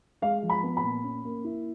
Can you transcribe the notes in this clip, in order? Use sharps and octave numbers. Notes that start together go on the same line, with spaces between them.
G#3 F5
F3
B5
B3
B5
A#2
C#4
A#3
E4